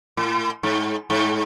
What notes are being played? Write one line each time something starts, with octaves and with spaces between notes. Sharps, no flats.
A2
G#2
G#2